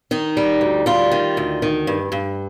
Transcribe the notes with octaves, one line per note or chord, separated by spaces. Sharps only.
D#3 D#4
G3
D2
G3 F4
D#3
D2
D#3
G2
G2